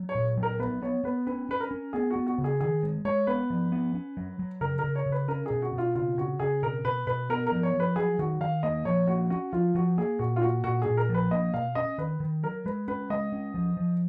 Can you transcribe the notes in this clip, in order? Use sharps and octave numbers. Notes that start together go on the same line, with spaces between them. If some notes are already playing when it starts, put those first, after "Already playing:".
Already playing: F#3
C#5
A#2
F#3
A#4
B3 B4
B3 C#5
B3 B4
C#4 B4
C#4 B4
A#4
C#4
B3 G#4
F#4
B3
F#4
C#3
G#4
D#3 G#4
G#3
G#3 C#5
B3 B4
F3
B3
C#4
F#3
F#3
C#3 A#4
A#4
C#3
C#5
C#3
B4
C#4 A#4
B2 G#4
F#4
B2 F4
C#3 F4
C#3 F#4
C#3 G#4
B2 A#4
B2 B4
B2 B4
B3 A#4
A#4
F3
C#5
F3
B4
F#3 G#4
D#3 F#4
D#3 F5
A#3 D#5
F3 C#5
A#3 F#4
C#4 F#4
F3 F4
F3 F#4
A#3 G#4
A#2 F#4
F4
A#3 F#4
A#2 F#4
A#2 G#4
A#4
F3
B4
A#3 D#5
B2 F5
C#4 D#5
D#3 B4
D#3
F#3 A#4
G#3 B4
C#4 B4
G#3 D#5
C#4
F3
F3